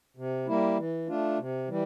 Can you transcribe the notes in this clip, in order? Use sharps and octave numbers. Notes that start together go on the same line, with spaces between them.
C3
G3 A#3 E4
E3
A3 D4 F4
C3
E3 G3